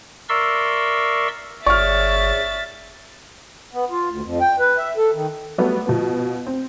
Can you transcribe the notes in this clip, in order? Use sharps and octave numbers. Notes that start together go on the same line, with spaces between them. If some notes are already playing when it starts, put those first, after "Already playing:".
A#4 D5 E5 C6 C#6 E6
G1 G#4 C#5 D5 E5 C#6 F6 A6
B3
F4
D2
F2
G5
B4
E5
A4
D#3
F#3 G3 A3 B3
B2 F3 B3
C4